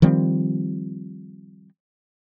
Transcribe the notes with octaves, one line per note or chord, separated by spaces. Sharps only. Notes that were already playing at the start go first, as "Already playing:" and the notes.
D#3 F3 G3 C4